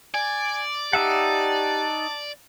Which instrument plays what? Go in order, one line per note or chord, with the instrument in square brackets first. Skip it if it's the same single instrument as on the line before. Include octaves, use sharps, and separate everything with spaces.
[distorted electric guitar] D5 [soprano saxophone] G#5
[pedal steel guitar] D#4 E5 F#5 [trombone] G4 [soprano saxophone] A5